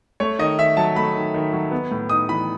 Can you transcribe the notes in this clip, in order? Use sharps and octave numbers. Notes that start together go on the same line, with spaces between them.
A3 C#5
D#3 D#5
D#3 E5
F#3 A5
A3 B5
D#3
D#3
F#3
B3
A2
D#4 D#6
E3 B5